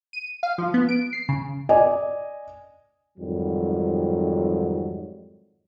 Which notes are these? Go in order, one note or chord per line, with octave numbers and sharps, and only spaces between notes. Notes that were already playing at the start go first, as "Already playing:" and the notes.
D#7
F5
F3
B3
D7
C7
C#3
D5 D#5 G#5
F2 G#2 D#3 F#3 G3